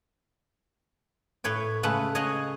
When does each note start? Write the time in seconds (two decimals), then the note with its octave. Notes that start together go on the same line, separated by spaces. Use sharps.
1.44 A2 B4 C#5 G5
1.83 C#3 G#3 A3 B4 F#5
2.15 C#5 D#5 F5 F#5 G#5